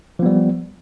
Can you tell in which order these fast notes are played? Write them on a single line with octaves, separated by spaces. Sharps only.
F3 B3 G3